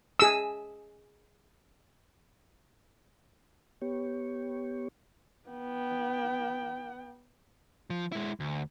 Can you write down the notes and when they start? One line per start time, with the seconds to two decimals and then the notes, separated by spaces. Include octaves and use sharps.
0.19 G#4 E6
3.82 B3 G4 C#5
5.49 B3 G5
7.90 F3
8.12 G#3 E4
8.40 D2